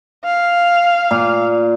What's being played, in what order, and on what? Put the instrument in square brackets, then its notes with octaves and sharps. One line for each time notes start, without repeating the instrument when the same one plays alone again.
[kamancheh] F5
[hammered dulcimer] A#2